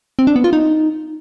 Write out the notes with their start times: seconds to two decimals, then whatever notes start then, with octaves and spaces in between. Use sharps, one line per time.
0.19 C4
0.27 D4
0.36 B3
0.44 F4
0.53 D#4